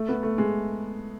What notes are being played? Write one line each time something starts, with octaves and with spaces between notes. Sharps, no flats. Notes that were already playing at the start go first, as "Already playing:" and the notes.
Already playing: A3
B3
A3
G#3